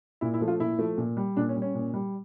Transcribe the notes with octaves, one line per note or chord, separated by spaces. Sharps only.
A#2 E4
E4
F3 A3
F4
A#2 E4
F3 A3
A#2
G3
A#2 D4
C#4
G3
C#4
A#2
G3